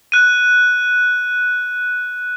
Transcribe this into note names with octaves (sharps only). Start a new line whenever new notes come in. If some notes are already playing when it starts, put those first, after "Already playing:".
F#6 D#7